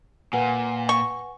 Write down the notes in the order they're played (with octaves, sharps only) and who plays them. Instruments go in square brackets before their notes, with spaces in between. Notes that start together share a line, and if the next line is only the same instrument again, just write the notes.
[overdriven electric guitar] A#2 [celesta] B4 F#5 G#5
[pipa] C#6